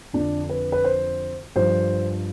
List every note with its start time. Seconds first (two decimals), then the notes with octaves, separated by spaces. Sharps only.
0.13 F2 D3 F3 D4
0.49 B4
0.72 B4
0.84 C5
1.56 G2 F3 C5